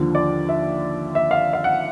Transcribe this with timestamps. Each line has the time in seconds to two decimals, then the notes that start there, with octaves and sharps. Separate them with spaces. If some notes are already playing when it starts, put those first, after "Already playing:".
Already playing: D#2 D3 F3
0.15 D5
0.49 E5
1.15 E5
1.31 F5
1.53 F5
1.64 F#5